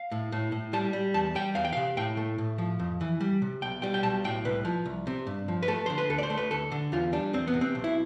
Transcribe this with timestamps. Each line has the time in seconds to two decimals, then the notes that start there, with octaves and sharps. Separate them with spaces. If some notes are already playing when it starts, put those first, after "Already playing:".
Already playing: F5
0.12 A2
0.32 A2
0.52 A2
0.73 G3 A5
0.93 G3
1.14 E2 A5
1.35 G3 G5
1.55 E2 F5
1.65 G5
1.72 C3 F5
1.97 A2 G5
2.17 A3
2.38 A2
2.58 F3
2.79 F2
3.01 E3
3.21 G3
3.42 C3
3.62 B1 G5
3.82 G3 G5
3.94 G5
4.03 B1 A5
4.24 A2 G5
4.45 C2 B4
4.65 F3
4.85 C2
5.07 C3
5.27 G2
5.48 F3
5.63 B4
5.68 A3 A4
5.86 D3 C5
5.98 B4
6.10 D2 A4
6.18 D5
6.23 C5
6.30 A3
6.37 B4
6.51 D2 A4
6.72 D3
6.92 E2 F4
7.13 G3 D4
7.33 E2 C4
7.47 B3
7.54 C3
7.61 C4
7.75 B1
7.84 E4